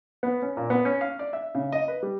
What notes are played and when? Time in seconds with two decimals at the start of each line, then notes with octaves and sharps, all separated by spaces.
0.23 B3
0.42 C#4
0.57 A#2
0.70 B3
0.85 C#4
1.01 F5
1.19 D5
1.33 E5
1.55 C#3
1.72 D#5
1.88 B4
2.03 G3